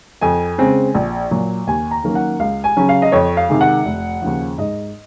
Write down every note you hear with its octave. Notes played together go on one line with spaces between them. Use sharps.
F2 G#5
C#3 G#3 C4
A#1
A#2 F#3
D#2 G#5
A#5
D#3 F#3 A#3 C#4
F#5
C#2 F5
G#5
C#3 F#3 C#4
F5
D#5
F2 C#5
F5
C3 D#3 G#3
F#5
F1
D#2 C#3 F3
G#2 D#5